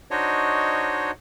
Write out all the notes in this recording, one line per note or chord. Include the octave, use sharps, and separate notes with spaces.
D4 D#4 F#4 C5 C#5 D#5